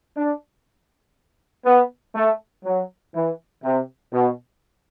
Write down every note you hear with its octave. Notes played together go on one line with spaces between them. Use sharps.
D4
B3
A3
F#3
E3
C3
B2